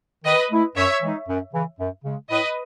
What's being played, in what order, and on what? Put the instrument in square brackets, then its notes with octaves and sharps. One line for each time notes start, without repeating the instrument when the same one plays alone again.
[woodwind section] D#3 [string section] B4 D#5
[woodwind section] A3 E4
[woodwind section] F#2 [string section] C#5 E5
[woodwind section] E3 G#3 D#4
F#2
C#3 E3
F#2
C#3 G#3
[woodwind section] A2 [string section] B4 D#5